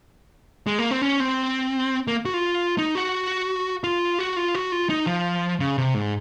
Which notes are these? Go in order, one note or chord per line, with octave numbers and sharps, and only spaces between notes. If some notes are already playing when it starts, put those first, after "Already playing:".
G#3
A#3
C4
C#4
C4
A#3
F#4
F4
D#4
F#4
F4
F#4
F4
F#4
F4
D#4
F3
C#3
C3
G#2